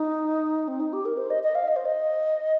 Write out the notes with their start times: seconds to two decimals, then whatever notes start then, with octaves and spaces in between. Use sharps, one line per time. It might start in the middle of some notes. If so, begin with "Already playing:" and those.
Already playing: D#4
0.68 C4
0.80 D#4
0.93 G4
1.05 A#4
1.17 C5
1.30 D#5
1.43 D#5
1.55 F5
1.68 D#5
1.76 C5
1.85 D#5